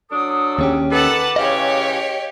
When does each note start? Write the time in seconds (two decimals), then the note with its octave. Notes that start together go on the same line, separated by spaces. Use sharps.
0.11 F#3 D4 A4 D#6
0.59 D#2 C#4 G4 G#4
0.90 D#3 A4 B4 F#5 A5 D6
1.36 C#3 E3 G#3 G4 C#5 D#5 F5